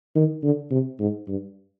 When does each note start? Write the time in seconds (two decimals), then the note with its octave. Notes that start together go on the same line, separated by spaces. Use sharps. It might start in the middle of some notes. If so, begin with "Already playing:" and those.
0.15 D#3
0.43 D3
0.71 C3
1.00 G#2
1.28 G2